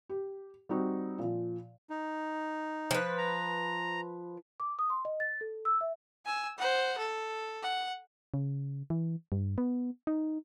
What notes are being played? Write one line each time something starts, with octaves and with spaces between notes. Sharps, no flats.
G4
G3 C4 D#4 F#4
A#2 F3
D#4
F3 B4
A#5
D6
D#6
C6
D#5
A6
A4
E6
E5
G#5 E6
C5 F#5
A4
F#5
C#3
E3
G2
B3
D#4